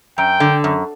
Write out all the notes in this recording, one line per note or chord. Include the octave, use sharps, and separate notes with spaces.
F#2 G5
D3
F#2